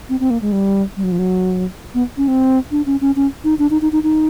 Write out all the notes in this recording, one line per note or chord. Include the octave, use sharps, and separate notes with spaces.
C4
C4
A#3
G#3
G3
G3
F#3
F3
F#3
B3
C#4
C4
D4
C#4
C#4
C#4
D#4
D4
D#4
D#4
D#4
D#4